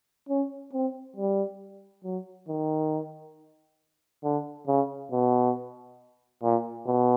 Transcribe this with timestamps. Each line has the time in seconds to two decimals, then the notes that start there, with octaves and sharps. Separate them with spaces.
0.29 C#4
0.73 C4
1.16 G3
2.04 F#3
2.48 D#3
4.24 D3
4.67 C#3
5.12 B2
6.43 A#2
6.87 B2